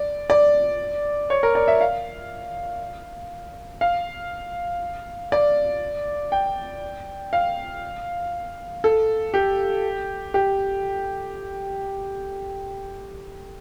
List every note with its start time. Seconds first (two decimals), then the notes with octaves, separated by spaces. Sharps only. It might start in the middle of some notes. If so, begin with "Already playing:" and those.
Already playing: D5
0.30 D5
1.30 C#5
1.43 A#4
1.55 D5
1.68 E5
1.81 F5
3.81 F5
5.32 D5
6.32 G5
7.33 F5
8.84 A4
9.34 G4
10.34 G4